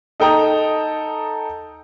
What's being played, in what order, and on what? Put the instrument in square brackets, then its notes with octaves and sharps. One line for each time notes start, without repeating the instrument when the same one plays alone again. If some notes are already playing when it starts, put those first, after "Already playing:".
[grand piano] D#4 A4 G5 A#5 D#6